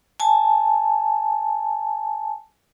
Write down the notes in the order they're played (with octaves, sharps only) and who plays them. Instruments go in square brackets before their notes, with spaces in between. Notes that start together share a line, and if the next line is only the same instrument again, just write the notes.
[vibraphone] G#5 A5